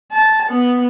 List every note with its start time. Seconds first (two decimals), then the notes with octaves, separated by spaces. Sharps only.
0.12 A5
0.49 B3